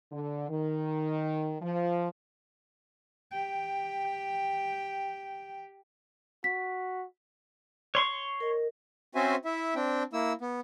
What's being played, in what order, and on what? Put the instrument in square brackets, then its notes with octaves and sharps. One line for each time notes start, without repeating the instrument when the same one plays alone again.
[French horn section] D3
D#3
F3
[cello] G4 G5
[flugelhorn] F#4 [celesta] B6
[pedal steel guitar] C#5 C6 C#6
[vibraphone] A#4 D#5
[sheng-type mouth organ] C4 C#4 F#4 C5 E5 G#5
E4 E5
C4 D4 G5
A#3 E4 E6
B3